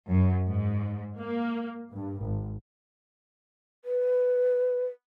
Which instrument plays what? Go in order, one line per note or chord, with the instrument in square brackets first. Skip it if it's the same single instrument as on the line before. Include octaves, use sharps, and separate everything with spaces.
[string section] F#2
G#2
A#3
G2
G#1
[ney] B4